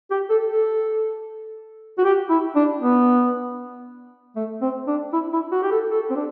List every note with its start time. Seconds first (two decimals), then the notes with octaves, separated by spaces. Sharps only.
0.11 G4
0.30 A4
0.50 A4
1.98 F#4
2.04 G4
2.29 E4
2.56 D4
2.81 B3
4.36 A3
4.62 C4
4.87 D4
5.13 E4
5.33 E4
5.52 F#4
5.62 G4
5.71 A4
5.91 A4
6.10 C4
6.16 D4